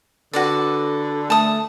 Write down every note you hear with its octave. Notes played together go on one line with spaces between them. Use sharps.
D3 F#4 A4 B4 D5
A3 A5 D#6